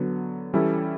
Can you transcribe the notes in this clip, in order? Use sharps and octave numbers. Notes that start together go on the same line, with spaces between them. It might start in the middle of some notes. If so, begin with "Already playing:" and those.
Already playing: D3 F#3 B3
E3 G3 C#4 E4 A4